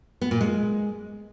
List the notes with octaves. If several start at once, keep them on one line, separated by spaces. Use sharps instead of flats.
B3
A#2
G#3